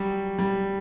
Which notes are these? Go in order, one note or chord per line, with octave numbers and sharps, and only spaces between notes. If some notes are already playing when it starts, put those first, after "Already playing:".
Already playing: F#3 G3
G3